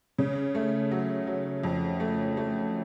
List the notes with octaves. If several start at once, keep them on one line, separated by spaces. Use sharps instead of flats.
C#3
A3
F#3
F#3
F2
A3
A3